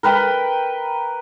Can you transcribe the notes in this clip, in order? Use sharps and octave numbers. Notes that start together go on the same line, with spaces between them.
A#4 B4 G5 B5